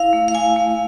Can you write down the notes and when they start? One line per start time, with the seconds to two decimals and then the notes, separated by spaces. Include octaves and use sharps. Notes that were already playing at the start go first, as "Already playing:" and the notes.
Already playing: E4 F5
0.13 A3
0.28 F5
0.34 E4 G#5
0.56 A3